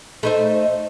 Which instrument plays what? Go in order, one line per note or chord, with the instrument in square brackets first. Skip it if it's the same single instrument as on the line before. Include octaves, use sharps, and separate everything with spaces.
[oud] A3 D#4 C5